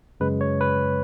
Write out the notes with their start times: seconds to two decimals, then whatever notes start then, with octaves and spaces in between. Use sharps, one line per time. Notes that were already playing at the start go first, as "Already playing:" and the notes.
0.20 F#2 C#3 G#3 B4
0.41 C#5
0.61 B4